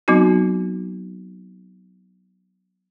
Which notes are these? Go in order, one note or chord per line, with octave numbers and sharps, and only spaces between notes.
F#3 B3 C4 D#4 F#4